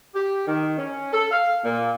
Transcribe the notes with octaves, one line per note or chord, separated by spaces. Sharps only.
G4
D#3
C#4
A4
F5
A#2